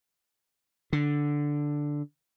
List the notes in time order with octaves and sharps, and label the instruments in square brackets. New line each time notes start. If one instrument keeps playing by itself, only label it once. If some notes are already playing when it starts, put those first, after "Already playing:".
[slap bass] D3